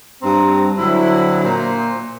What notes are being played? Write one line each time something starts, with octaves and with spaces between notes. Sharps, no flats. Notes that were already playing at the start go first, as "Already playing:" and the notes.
G2 C4 A#5
D3 F#3 C4 E4
A#2 C5 A#5